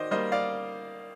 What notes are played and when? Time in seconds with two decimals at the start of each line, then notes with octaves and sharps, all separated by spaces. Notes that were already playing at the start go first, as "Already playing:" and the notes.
Already playing: D#3 C5 D5 D#5
0.11 G3 A#3 C5 D#5
0.32 D5 F5